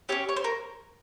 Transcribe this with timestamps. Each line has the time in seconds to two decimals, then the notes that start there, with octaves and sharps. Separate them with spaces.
0.09 C#4 E4 G4 C#5
0.29 C#5
0.36 C5
0.44 A#4